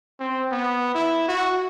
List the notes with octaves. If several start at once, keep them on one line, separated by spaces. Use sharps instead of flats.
C4
B3
E4
F#4